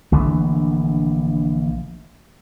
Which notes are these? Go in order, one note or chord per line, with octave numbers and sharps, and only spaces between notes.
A#1 D3 E3 A3